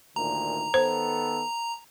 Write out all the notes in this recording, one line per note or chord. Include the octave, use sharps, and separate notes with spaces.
D2 A#2 D#3 A#5
D#3 B3 A4 C5